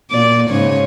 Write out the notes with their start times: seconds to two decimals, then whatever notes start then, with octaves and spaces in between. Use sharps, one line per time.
0.10 A#2 D5
0.50 G#2 C#3 C#5